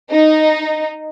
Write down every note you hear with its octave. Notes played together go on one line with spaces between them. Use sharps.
D#4